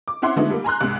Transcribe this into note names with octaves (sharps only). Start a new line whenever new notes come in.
D6
C4 C#4 E4 F#5 C6
D3 F3 G#3 A3 B3 D#4
G3 A#3
G#5 A#5 C6 F#6
C2 G#2